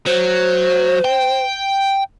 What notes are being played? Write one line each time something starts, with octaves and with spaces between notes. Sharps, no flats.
F#3 C5
G5